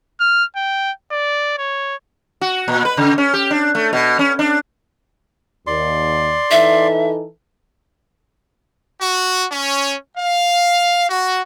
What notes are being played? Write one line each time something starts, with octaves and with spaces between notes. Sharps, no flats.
F6
G5
D5
C#5
F#4
A#2
B4
C#3
C#4
G4
D4
A3
B2
C#4
D4
D#2 D5 C6
E3 D#4 A4 E5
F#4
C#4
F5
F#4